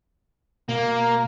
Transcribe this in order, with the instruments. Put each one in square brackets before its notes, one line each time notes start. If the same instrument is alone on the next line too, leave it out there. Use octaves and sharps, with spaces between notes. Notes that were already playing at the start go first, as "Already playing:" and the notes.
[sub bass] B2 [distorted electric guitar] A#3